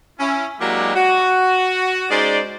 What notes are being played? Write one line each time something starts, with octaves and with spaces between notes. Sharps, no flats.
C#4 E4
F#3 G#3 A#3 D4 E4 G4
F#4
G#3 C#4 D#4 C5 D5